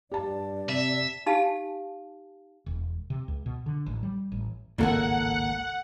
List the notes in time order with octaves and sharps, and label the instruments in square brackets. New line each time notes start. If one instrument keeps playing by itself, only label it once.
[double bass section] G2 [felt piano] G4 A5 [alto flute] D5
[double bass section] C3 [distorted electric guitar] E5
[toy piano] D#4 G4 F5 G#5 A5
[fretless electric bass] E1
C3
C#2
B2
D3
A1
G3
A1
[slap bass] G#1 C#2 A2 [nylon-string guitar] A#3 A4 G#5 [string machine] F#5